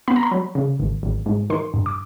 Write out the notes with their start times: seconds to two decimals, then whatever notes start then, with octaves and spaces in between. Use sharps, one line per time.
0.08 B3 B5
0.16 A#5
0.23 B5
0.31 F#3
0.55 C#3
0.79 G#1
1.03 G#1
1.26 G#2
1.50 D#3 C6
1.74 G2
1.86 D6